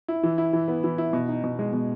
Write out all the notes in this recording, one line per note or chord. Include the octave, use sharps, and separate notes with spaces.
E4
E3
E4
E3
B3
E3
E4
B2
D#4
B2
G#3
B2